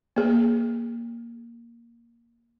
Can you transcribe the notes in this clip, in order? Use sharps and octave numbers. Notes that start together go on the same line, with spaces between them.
A#3 G#4